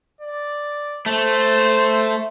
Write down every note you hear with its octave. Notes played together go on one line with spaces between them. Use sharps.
D5
A3 C5